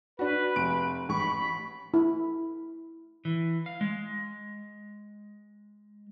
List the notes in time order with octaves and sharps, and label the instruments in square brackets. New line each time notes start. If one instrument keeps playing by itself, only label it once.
[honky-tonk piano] D4 F#4 [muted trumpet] B4
[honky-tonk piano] F1 D7
[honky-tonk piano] A1 C#6 [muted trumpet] B5
[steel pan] E4
[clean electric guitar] E3
F5
G#3